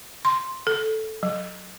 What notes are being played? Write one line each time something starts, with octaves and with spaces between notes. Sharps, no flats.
C6
A4
F#3